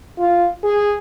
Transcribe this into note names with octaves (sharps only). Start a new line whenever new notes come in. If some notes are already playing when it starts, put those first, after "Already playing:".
F4
G#4